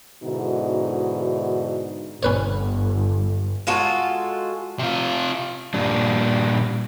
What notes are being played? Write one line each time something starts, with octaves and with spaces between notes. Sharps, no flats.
G#2 B2 D3 D#4 E4 F#4
G1 C#4 B4 C#5
G#3 F4 F#4 A4
C3 F4
A#2 G3 D4